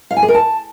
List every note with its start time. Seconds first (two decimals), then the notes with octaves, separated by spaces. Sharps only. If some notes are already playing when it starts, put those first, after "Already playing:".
0.11 F5
0.17 G#5
0.22 G#4
0.28 A#4
0.34 A5